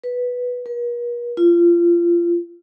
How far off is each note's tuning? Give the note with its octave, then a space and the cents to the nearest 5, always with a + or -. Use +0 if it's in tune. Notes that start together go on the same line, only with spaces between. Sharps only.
B4 -5
A#4 +45
F4 -25